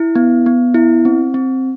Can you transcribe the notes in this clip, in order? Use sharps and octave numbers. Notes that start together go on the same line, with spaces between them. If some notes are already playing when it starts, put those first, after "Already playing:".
Already playing: E4
B3
B3
E4
C4
C4